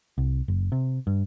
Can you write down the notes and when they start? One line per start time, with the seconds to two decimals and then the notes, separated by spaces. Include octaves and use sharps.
0.18 C2
0.48 F#1
0.72 C3
1.07 G2